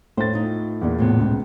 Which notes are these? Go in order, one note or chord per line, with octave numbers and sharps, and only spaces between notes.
A2 C5 A6
D#4 F4
E2 A#2
A2 C3 B3
C#2